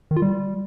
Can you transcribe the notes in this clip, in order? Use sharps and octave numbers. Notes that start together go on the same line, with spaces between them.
D#3
F4
G3